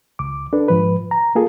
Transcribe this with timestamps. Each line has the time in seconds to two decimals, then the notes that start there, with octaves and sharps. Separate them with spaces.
0.19 C#2 D6
0.53 D4 A4 B4
0.68 G#2 F3 B4
1.11 A#5
1.35 A#3 F4 G#4 A4